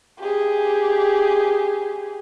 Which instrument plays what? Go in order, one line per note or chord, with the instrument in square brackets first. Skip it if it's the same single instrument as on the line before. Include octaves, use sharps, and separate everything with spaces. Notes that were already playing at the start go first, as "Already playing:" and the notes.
[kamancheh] G4 G#4